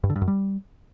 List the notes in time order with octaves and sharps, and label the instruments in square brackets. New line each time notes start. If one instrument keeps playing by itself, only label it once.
[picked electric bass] G2
D3
G2
F#2
G3